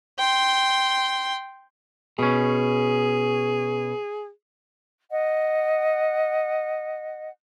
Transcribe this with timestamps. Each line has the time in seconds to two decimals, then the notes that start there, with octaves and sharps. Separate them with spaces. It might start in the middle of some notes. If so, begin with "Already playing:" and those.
0.18 G5 C6
2.19 B2 C#4 G#4
5.10 D#5 F#5